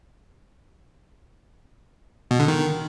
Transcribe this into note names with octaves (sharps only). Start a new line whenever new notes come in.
B2
D3
D#3